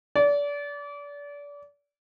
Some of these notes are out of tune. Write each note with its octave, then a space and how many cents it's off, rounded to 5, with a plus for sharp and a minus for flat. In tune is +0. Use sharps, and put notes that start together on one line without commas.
D5 -30